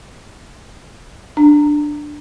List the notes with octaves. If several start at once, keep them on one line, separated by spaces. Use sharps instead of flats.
D4